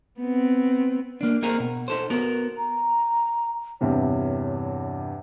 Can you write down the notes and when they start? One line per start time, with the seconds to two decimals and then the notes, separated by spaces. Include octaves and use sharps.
0.20 B3 C4
1.21 A#3 D4
1.42 A#3 C4 D#4 G#4 A#4
1.60 B2
1.88 D#4 A4 C5
2.10 B3 F#4 A#4
2.58 A#5
3.81 E2 G2 C3 C#5